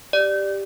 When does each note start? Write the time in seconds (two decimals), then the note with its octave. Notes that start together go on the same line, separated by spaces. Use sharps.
0.13 G4 D5